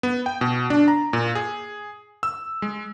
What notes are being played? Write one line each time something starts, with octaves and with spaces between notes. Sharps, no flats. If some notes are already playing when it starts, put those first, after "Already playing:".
B3
G5
B2
D4
A#5
A#2
G#4
E6
G#3